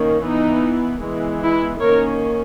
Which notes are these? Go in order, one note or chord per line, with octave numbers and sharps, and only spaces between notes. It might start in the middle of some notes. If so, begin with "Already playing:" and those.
Already playing: D#3 A#3 C#4
E3 B3 D#4
E3 G#3 B3
E4
D#3 A#3 C#4 A#4 C#5